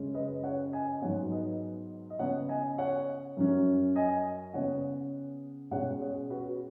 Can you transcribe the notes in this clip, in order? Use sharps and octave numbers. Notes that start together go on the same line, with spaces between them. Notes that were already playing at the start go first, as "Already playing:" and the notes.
Already playing: F#2 C#3 G#3 C#4
B4 D#5
C#5 F#5
D#5 G#5
G#2 F#3 B3 C#5 F#5
B4 D#5
D#5
C#3 B3 C#5 F#5
D#5 G#5
C#5 F#5
F#2 F#3 C#4
D#5 G#5
C#3 B3 C#5 F#5
B2 G#3 C#4 C#5 F#5
G#4 C#5
F#4 B4